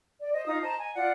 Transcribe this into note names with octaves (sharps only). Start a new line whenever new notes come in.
D5
C5 D#5
D#4 F4 D#6
C5 D#5 A5 A#5
G#5
F4 D5 F#5